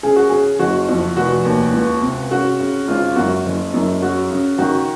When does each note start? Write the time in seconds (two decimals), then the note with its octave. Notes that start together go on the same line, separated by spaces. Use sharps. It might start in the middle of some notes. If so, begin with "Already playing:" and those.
0.03 C#3 G#4
0.16 F#4
0.29 C#3 G#4
0.59 F#1 F#4
0.89 F2
1.16 F1 F#4
1.45 D#2
1.73 C#2
2.02 C3
2.31 C#3 F#4
2.60 C#3
2.88 G#1 F4
3.16 F#2 F#4
3.45 F#1
3.74 F#2
4.02 C#3 F#4
4.31 C#3
4.58 D#3 F#4